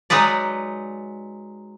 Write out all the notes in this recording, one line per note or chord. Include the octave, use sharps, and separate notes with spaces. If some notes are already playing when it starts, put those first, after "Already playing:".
F#3 G#3 D#4 B4 D5